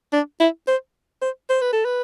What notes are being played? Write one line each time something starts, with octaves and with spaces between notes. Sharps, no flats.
D4
E4
C5
C5
C5
B4
A4
B4